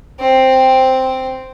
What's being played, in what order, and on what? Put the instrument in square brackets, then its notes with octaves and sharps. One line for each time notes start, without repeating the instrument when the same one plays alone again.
[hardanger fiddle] C4